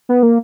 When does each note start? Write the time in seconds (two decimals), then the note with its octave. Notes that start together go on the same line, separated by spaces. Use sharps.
0.09 B3
0.23 A#3